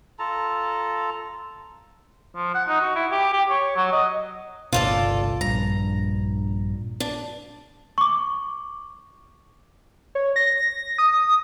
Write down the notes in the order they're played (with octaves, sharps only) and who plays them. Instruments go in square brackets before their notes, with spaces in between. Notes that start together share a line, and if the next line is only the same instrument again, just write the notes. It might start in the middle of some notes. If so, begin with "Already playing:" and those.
[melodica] F4 A4 A5 A#5
[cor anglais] F3
F#5
D#4
F#4
E4
G4
G4
C#5
F#3
D#5
[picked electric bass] G1 C2 B2 [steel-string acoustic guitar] F4 A4 D5
[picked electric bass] A#1 G2 [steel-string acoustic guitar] A#5
[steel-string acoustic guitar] D4
[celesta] C#6 D6
[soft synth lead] C#5
A#6
D#6